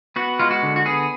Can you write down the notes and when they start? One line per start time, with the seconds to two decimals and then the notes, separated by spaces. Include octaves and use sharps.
0.16 B3 F#4
0.39 G#3 F4
0.51 F#4
0.62 D3
0.76 F#4
0.86 B3 G#4